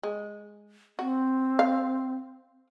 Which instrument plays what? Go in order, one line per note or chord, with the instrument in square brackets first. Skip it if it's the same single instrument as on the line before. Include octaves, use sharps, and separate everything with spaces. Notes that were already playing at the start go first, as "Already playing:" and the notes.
[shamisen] G#3
[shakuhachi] C4 [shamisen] F#4
[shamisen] F5